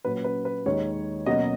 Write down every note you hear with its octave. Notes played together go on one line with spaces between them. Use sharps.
A#2 F#3 C#4 B4
B4
B4
D#2 D#3 G#3 C#5
B2 F#3 A#3 C#4 D#5